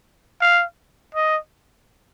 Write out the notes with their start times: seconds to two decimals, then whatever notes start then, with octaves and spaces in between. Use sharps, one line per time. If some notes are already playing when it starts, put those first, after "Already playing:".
0.41 F5
1.15 D#5